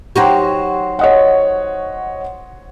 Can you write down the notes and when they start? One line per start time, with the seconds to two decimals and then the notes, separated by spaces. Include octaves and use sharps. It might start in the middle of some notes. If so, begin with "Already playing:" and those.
0.16 F#3 D#4 F#4 G4 C5
0.99 C#5 D#5 F#5